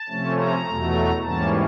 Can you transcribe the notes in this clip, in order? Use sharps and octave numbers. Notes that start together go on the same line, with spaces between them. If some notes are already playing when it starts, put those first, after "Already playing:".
Already playing: A5
C3 F3 A3 C#4
A#5
E2 B2 F#3 A3
G#2 E3 G3 A#3 C#4 A5